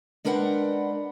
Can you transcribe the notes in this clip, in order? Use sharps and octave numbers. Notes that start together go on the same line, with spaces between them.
G#3 D4 A#4 B4 F#5 G5